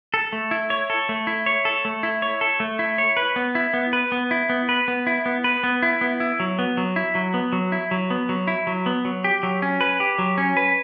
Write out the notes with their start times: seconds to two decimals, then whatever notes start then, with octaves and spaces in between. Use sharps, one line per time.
0.14 A4
0.33 A3
0.51 E4
0.70 C#5
0.90 A4
1.09 A3
1.27 E4
1.46 C#5
1.65 A4
1.85 A3
2.03 E4
2.22 C#5
2.41 A4
2.60 A3
2.79 E4
2.98 C#5
3.17 B4
3.36 B3
3.55 E4
3.74 B3
3.93 B4
4.12 B3
4.31 E4
4.50 B3
4.69 B4
4.88 B3
5.07 E4
5.26 B3
5.44 B4
5.64 B3
5.83 E4
6.01 B3
6.20 E4
6.40 F#3
6.59 B3
6.77 F#3
6.96 E4
7.15 F#3
7.34 B3
7.53 F#3
7.72 E4
7.91 F#3
8.10 B3
8.29 F#3
8.47 E4
8.67 F#3
8.86 B3
9.05 F#3
9.24 G4
9.43 F#3
9.62 C#4
9.81 B4
10.00 G4
10.19 F#3
10.38 C#4
10.57 B4